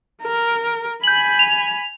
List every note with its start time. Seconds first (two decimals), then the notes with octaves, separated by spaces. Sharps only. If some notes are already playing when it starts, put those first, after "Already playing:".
0.23 A#4
1.04 G#5 B5 G6 F#7
1.39 F7